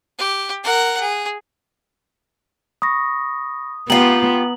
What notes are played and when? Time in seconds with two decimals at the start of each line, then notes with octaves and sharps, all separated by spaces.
0.19 G4
0.64 A#4 F#5
1.00 G#4
2.82 B5 C#6 D#6 A#6
3.90 B3 F4 G4 A#5 F#7